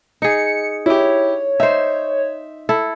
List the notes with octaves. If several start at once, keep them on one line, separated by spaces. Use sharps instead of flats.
D#4 G#4 C#7
E4 G4 C#5
D#4 C5 E5
E4 A4